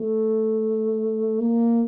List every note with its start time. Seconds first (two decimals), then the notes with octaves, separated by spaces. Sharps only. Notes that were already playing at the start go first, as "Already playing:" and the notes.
Already playing: A3
1.40 A#3